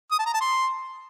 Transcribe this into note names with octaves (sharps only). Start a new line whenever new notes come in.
D#6
A5
A#5
A5
C6